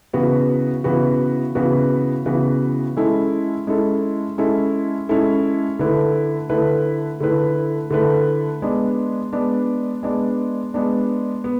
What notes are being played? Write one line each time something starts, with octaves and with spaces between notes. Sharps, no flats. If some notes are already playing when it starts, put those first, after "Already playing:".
C#3 E3 B3 F#4 B4
C#3 E3 B3 F#4 B4
C#3 E3 B3 F#4 B4
C#3 E3 B3 F#4 B4
G#3 C#4 E4 A4
G#3 C#4 E4 A4
G#3 C#4 E4 A4
G#3 C#4 E4 A4
D3 A3 E4 B4
D3 A3 E4 B4
D3 A3 E4 B4
D3 A3 E4 B4
G#3 B3 D4
G#3 B3 D4
G#3 B3 D4
G#3 B3 D4
B3